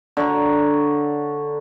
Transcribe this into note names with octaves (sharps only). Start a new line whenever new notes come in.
D3 C#5 A#5